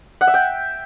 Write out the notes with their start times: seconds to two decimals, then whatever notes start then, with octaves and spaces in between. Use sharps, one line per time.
0.21 F#5
0.27 E5
0.34 G5